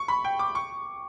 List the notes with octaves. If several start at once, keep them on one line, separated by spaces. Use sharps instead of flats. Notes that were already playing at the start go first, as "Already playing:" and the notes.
Already playing: C#6
B5
G5
D6
C#6